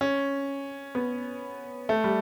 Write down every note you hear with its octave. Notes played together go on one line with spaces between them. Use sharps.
C#4
B3
A3
G3